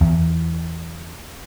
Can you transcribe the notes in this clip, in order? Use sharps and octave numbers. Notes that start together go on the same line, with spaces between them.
E2